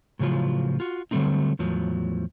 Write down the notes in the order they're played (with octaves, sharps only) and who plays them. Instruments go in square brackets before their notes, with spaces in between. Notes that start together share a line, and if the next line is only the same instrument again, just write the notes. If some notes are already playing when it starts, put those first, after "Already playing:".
[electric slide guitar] A2 C#3 F3 F#3 F4
F4 F#4
D3 F#3 G3 A3 C4 D#4
E2 A2 F3 F#3